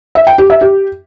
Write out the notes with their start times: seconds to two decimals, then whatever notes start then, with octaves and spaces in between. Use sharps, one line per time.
0.15 E5
0.27 G5
0.38 G4
0.50 E5
0.61 G4